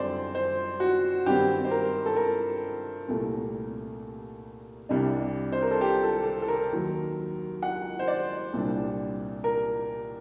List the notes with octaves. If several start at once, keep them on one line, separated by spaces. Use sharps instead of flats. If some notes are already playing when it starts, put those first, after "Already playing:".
Already playing: F#2 D3 G3 C4 C5 D5
C5
F#4
G2 D#3 G3 C4 G4
C5
A#4
A4
A#4
C2 A#2 A3
C2 C3 G3 D4
C5
A#4
A4
G4
A4
A4
A4
A#4
D#2 D#3 F#3
F#5
C5
D5
C2 A#2 G3 D4
A#4